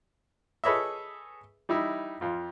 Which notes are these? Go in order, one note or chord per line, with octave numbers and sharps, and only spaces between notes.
G#4 A4 B4 C#5 D#5 E5
G3 D#4 E4 E5
F2 F4